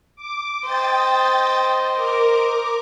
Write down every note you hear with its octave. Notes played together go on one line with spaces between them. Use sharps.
D6
C5 D#5 G5 D#6 A6
A#4 D6